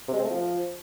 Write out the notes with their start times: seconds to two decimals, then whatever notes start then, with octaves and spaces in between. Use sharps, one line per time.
0.08 C3
0.14 G#3
0.19 C4
0.25 A3
0.30 F3